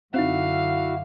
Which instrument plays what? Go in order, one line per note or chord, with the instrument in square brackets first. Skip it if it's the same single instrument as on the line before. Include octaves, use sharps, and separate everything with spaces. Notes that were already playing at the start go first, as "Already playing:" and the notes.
[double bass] F#2 D3 [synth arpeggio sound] C4 D#4 [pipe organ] E4 F#4 [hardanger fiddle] F5